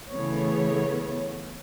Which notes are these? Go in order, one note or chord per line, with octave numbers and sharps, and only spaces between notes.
C#3 E3 A3 B3 C#5